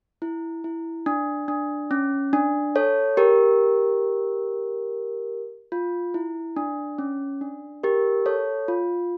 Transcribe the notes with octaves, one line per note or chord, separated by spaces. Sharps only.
E4
E4
D4
D4
C#4
D4
A4 C#5
G4 A#4
F4
E4
D4
C#4
D4
G4 A#4
A4 C#5
F4